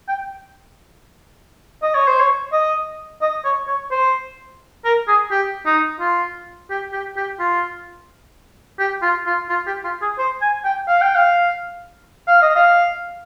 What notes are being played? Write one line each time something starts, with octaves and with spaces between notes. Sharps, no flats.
G5
D#5
C#5
C5
C#5
D#5
D#5
C#5
C#5
C5
A#4
G#4
G4
D#4
F4
G4
G4
G4
F4
G4
F4
F4
F4
G4
F4
G#4
C5
G#5
G5
F5
G5
F5
F5
D#5
F5